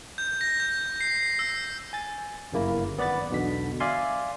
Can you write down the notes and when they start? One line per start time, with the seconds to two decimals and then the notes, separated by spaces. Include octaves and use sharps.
0.18 G6
0.41 A#6
0.60 G6
1.01 C7
1.39 E6
1.93 G#5 A6
2.52 G1 F#2 C#3 A#3 E4
2.98 G#1 B3 D5 F#5 B5 A6
3.30 B1 E2 B2 D3 B6
3.80 D5 E5 F5 G#5 C6